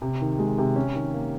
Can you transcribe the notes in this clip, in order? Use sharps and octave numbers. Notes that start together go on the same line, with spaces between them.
C3
D#3
G#3
C3
C#4
D#3
A#3